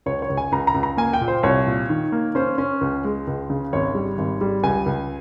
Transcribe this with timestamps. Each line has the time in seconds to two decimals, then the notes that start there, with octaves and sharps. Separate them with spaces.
0.06 C#2 C#5
0.22 C#5
0.30 C#2
0.37 G#5
0.52 C#2 A#5
0.67 A#5
0.74 C#2
0.83 A#5
0.97 A#3 G#5
1.13 G5
1.21 A#2
1.28 C5
1.43 C2 C#5
1.67 A#2
1.89 D#3
2.12 A#3
2.35 C#4 C5
2.58 C#4
2.81 C#2
3.04 G#3
3.27 C#2
3.50 C#3
3.73 G#1 C#5
3.95 G3
4.18 G#1
4.41 G3
4.63 C#2 G#5
4.86 C#2